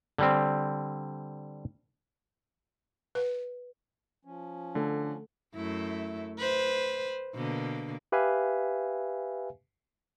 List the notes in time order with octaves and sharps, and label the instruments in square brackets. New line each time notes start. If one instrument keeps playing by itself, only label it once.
[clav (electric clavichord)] D3 G3 C4
[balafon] B4
[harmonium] F3 C#4
[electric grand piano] D3 [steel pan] A3 A4
[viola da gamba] F#2 A3 E4
B4 C5
B2 D3 A#3
[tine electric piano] G4 B4 E5 F5 G#5